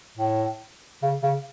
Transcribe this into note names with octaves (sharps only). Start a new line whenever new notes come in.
A2
C#3
C#3